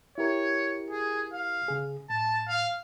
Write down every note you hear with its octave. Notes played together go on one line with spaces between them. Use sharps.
E4 G4 A#4 C#5
G#4
F5
C#3 G#4
A2 A5
F5